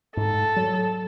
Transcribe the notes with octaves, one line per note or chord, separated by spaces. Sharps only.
G#2 A4
F#3